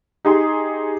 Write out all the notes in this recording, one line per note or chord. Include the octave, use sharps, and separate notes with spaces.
D#4 G4 G#4 C6